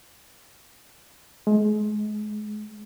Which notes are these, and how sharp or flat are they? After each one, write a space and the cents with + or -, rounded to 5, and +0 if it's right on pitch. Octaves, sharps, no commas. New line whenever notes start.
G#3 +30